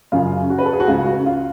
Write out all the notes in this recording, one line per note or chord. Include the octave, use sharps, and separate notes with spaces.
F#2 C#3 F4
F#4
B4
A4
G#4
F#4
C#2 C#3 F4
F#4
F4